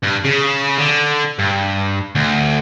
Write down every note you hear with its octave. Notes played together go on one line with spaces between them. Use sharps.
G2
C#3
D3
G2
D2